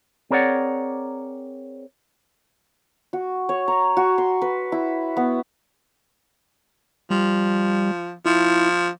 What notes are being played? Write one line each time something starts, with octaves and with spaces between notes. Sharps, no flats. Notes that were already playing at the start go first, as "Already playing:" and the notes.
C4 G#4 A#4 C#5 D5 F#5
F#4
C#5
A#5
F#4
C6
B4
E4
B3
F3 G3
F3 E4